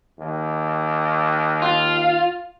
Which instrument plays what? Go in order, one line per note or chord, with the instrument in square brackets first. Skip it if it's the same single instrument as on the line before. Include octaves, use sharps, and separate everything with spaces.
[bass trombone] D#2
[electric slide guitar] F4